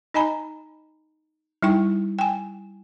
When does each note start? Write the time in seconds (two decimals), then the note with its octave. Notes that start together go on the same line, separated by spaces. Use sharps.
0.14 D#4 D#5 G#5 A#5 B5
1.63 G3 D#4 E4 G5 C#6
2.19 G5 G#5